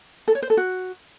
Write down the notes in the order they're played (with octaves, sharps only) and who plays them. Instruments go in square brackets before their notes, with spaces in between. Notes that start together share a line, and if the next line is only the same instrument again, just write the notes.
[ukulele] A4
C#5
C5
A4
F#4